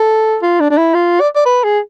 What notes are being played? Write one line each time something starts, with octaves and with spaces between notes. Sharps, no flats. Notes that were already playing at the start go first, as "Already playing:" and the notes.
Already playing: A4
F4
D4
D4
E4
F4
D5
D5
B4
G#4